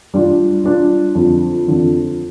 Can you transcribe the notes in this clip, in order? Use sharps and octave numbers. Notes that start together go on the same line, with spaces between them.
G3 D4 F4
G3 D4 F4
F2 D3 F3
F2 D3 F3